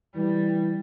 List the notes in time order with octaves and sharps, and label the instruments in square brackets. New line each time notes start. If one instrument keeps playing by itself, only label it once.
[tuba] E3 [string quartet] G3